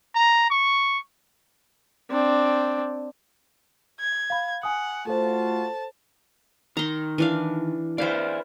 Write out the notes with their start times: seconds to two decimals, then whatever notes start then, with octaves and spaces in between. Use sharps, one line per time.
0.15 A#5
0.50 C#6
2.11 C4 D4
4.00 G#6
4.30 F5 B5
4.63 F#5 G#5 D#6
5.07 A3 F4 F#4 A4 C5 A5
6.77 D#3 A#5 C6
7.18 E3 D4 F5
7.98 E4 B4 C5 D5 F5